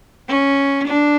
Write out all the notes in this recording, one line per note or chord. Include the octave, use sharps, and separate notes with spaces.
C#4
D4